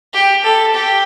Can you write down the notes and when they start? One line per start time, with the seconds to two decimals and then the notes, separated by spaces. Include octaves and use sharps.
0.13 G4
0.44 A4
0.74 G4